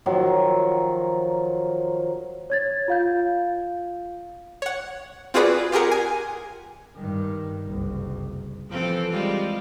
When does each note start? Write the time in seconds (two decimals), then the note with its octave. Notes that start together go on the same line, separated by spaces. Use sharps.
0.06 D#3 F3 F#3
2.50 C#5 G#6 A6
2.88 F4 F5 G6
4.62 C#5 F#5
5.34 C4 F4 F#4 G#4 B4 D5
5.72 F4 G4 G#4 A#4 F#5
5.91 G#5
6.95 G2 D#3
7.65 F#1 C2
8.69 E3 F3 C4 A4
9.10 G3 G#3 F4